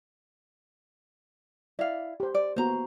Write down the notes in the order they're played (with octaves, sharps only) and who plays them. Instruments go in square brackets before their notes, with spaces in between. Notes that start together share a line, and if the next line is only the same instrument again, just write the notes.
[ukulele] E4 F5 [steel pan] D5
[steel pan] G4 C5
[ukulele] D5
[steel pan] A#3 B3 F#4 [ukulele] C5 A#5